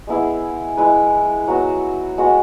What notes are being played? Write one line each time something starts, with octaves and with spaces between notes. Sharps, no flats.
G#3 B3 E4 G#4
G#3 E4 B4
F#3 B3 F#4
G#3 B3 F#4